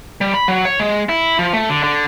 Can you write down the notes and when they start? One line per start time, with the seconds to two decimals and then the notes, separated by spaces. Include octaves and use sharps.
0.21 G3
0.34 B5
0.48 F#3
0.65 C#5
0.80 G#3
1.09 E4
1.39 F3
1.53 A3
1.69 D3
1.83 D3